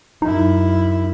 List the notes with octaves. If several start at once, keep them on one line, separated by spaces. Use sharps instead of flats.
F#2 D#4 E4